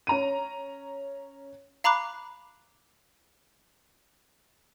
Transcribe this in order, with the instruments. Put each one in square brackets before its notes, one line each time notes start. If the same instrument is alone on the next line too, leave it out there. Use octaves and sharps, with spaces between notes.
[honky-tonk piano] C#4 A#5 D#7
[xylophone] F5 A#5 B5 D6 F#6